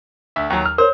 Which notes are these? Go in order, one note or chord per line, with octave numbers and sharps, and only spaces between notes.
D2 E5
D#2 F#3
F6
A#4 C5 C#5